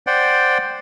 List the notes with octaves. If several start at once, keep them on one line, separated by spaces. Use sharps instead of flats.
C5 D5 F#5 G5